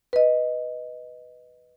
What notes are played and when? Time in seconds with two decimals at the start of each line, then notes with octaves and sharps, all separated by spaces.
0.13 B4 D#5